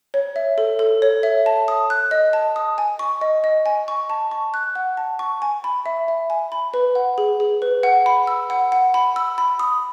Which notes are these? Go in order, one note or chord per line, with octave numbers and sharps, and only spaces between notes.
C#5
E5
A4
A4
C#5
E5
A5
D#6
F#6
D#5
A5
D#6
G#5
C#6
D#5
D#5
G#5
C#6
A5
C#6
F#6
F#5
A5
C#6
G#5
B5
E5
E5
G#5
B5
B4
F#5
G#4
G#4
B4
F#5
B5
E6
F#5
F#5
B5
E6
B5
D#6